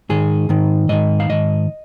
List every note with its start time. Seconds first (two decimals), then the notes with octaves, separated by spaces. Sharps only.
0.09 G#2 D#3 G#4
0.49 G#2 D#3
0.89 G#2 D#3 D#5
1.20 F5
1.30 G#2 D#3 D#5